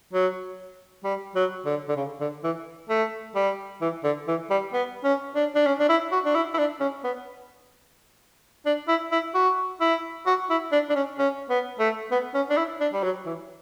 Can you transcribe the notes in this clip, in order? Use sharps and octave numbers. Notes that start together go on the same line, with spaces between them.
F#3
G3
F#3
D3
D3
C#3
D3
E3
A3
G3
E3
D3
E3
G3
B3
C#4
D4
D4
C#4
D4
E4
F#4
D4
E4
E4
D4
C#4
B3
D4
E4
E4
F#4
E4
F#4
E4
D4
D4
C#4
C#4
B3
A3
B3
C#4
D4
E4
D4
G3
F#3
E3